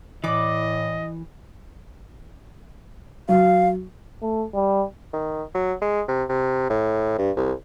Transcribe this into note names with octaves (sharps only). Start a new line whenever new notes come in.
A2 E3 D5 D#5 B5 D6
F#3 F5
A3
G3
D#3
F#3
G#3
C3
C3
A2
G2
C2